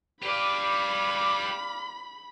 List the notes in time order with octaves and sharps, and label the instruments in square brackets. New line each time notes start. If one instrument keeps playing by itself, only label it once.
[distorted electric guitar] G4 B4 [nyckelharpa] D5 F5 [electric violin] B5